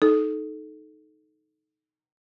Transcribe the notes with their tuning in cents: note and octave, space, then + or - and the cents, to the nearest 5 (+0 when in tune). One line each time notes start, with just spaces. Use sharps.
D#4 +0 A4 -20